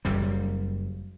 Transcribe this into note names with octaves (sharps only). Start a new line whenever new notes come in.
F#1 F#2 G3